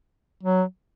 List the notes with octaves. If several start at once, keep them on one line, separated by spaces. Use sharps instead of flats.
F#3